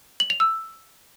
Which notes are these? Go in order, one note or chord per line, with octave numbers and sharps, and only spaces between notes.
F#7
F7
E6